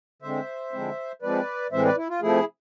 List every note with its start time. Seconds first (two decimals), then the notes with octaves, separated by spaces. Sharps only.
0.22 D3 G#3 C4 C5 E5
0.72 D3 F3 G#3 C4 E4
1.22 F3 G#3 C4 B4 D5
1.71 A2 E3 G#3 C4 C5 E5
1.84 B4 D5
1.97 E4
2.09 F4
2.22 C3 F3 A3 E4 G#4